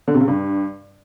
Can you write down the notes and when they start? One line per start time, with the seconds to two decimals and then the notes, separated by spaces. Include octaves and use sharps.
0.08 D3
0.14 C3
0.21 C#3
0.28 G2